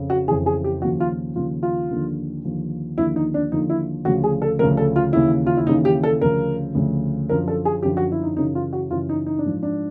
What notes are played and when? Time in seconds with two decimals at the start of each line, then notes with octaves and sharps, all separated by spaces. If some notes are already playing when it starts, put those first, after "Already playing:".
Already playing: F2 C#3
0.10 F#4
0.28 E3 G#4
0.31 F2 C#3
0.46 G#4
0.64 G4
0.82 D#2 C#3 F3 F#4
1.00 F4
1.36 D#2 C#3 F3 F4
1.63 F4
1.90 D#2 D3 F3
2.44 D#2 D3 F3
2.98 D#2 D3 F3 E4
3.16 D#4
3.34 D4
3.52 D#2 D3 F3 D#4
3.70 E4
4.05 D2 C#3 F3 F#4
4.24 G#4
4.42 A4
4.59 D2 C#3 F3 A#4
4.77 A4
4.96 F4
5.13 D#2 C#3 E3 E4
5.46 F4
5.57 E4
5.67 D#2 C#3 E3 D#4
5.85 G4
6.03 A4
6.21 D2 C#3 F3 A#4
6.75 D2 C#3 F3
7.29 F#2 D3 F3 A#4
7.48 A4
7.65 G#4
7.83 F#2 D3 F3 G4
7.97 F#4
8.12 E4
8.23 D#4
8.37 F#2 C#3 E3 D#4
8.55 F4
8.73 F#4
8.91 F#2 C#3 E3 F4
9.09 D#4
9.26 D#4
9.39 D4
9.45 G#2 F3
9.63 D4